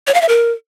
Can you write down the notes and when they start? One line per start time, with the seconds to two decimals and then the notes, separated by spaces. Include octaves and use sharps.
0.07 C#5
0.14 F5
0.21 E5
0.29 A#4